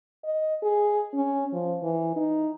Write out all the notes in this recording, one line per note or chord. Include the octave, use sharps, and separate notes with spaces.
D#5
G#4
C#4
F3
E3
D#4